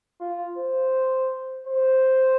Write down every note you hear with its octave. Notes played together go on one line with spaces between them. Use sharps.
F4
C5
C5